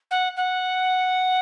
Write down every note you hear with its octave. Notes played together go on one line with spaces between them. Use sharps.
F#5
F#5